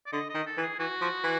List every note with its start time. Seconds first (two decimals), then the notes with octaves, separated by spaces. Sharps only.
0.06 D5
0.12 D3 D#5
0.30 D#3 D#5
0.46 A4
0.57 E3
0.63 G#4
0.79 E3 F#4
1.01 F3
1.24 E3